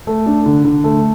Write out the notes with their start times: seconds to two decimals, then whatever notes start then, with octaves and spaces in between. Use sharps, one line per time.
0.07 A3
0.26 D4
0.46 D3
0.65 D3
0.84 A3